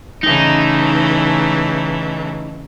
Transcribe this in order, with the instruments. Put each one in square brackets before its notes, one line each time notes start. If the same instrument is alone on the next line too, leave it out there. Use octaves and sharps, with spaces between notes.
[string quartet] C#3 E3 A3 [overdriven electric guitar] D#4